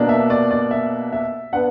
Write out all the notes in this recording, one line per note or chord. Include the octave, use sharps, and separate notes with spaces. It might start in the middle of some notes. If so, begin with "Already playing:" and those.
Already playing: B2 A#3 D4
E5
D5
D5
E5
E5
B3 D4 F#5